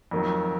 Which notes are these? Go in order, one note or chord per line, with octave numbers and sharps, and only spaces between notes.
F2 D#3 F#3